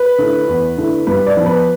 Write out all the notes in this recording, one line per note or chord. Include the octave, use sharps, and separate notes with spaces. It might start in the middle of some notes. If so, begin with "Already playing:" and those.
Already playing: B4
D3 A3 E4
E2
D3 A3 E4
G2 B4
D5
F3 B3
B4